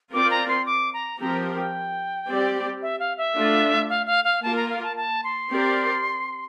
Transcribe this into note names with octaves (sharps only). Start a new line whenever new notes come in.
C4 F4 A#4 D5 D6
A#5
C6
D6
A#5
F3 C4 G4 A#4 A#5
G5
G3 C4 G4 D5
E5
F5
E5
A3 D4 F4
F5
F5
F5
A#3 F4 A#4 A5
A#5
F5
A5
A5
C6
C4 G4 A#4 D5